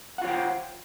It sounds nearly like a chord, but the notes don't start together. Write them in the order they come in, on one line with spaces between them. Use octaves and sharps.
F#5 F4 C#5 G5 C5